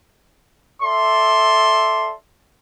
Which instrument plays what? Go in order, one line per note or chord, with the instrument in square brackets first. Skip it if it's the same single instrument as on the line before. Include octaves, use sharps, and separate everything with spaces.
[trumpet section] A4 D5 E5 C6